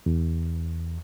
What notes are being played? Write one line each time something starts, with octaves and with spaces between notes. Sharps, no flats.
E2